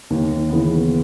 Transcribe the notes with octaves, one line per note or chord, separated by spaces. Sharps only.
D#2
C#3 E3 B3